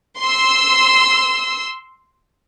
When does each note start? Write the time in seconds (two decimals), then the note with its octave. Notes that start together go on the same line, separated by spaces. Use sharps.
0.21 C6 E6